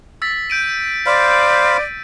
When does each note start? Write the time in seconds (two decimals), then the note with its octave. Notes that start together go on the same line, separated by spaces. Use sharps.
0.22 E6 A6 B6
0.50 G6 D7 D#7
1.06 C5 D5 F5 B5